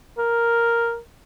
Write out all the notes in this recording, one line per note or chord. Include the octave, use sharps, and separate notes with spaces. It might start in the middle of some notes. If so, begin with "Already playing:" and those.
A#4